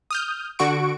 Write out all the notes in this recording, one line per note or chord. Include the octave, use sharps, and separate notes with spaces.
D#6 F6 G6
D3 F#4 C#6 D7